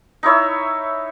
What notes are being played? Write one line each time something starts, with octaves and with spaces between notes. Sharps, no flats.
D#4 E4 C#5 E5